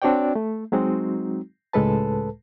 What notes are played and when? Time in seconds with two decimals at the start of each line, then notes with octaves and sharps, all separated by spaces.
0.02 C4 D4 F#4 C#5 D5 G5
0.35 A3
0.72 F#3 G#3 C4 D#4 F#4
1.73 C#2 A2 G#3 A4 B4 A5